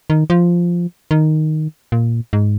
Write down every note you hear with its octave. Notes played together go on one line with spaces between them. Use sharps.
D#3
F3
D#3
A#2
G#2